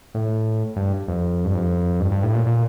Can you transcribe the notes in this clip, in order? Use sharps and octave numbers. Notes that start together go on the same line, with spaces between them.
A2
G2
F2
G2
F2
G2
G2
A2
A#2
A#2